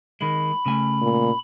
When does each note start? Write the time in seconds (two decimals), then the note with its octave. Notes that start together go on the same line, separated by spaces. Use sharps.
0.21 D#3 G#3 B5
0.66 C#3 A3 G#5
1.01 A#2